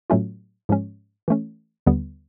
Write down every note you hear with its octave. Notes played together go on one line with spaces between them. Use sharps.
A2 F#3 A3 C#4 F4
G#2 F3 G#3 C#4
E3 A3 C#4
D#2 D3 G3 B3